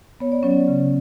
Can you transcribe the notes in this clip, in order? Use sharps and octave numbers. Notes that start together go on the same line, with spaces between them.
B3 C#5
D5
F#3 C#4 C#5
C#3